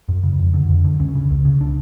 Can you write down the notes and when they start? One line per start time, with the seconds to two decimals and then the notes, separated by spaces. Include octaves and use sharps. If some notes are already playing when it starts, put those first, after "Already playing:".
0.09 F#2
0.23 C#3
0.39 F2
0.54 D3
0.69 F2
0.84 D3
0.99 C#2 C#4
1.15 C#3
1.30 C#2
1.45 C#3
1.61 D4